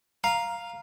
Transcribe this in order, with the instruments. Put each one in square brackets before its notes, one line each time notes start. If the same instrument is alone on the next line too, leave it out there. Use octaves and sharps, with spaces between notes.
[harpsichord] F5 [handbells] A#5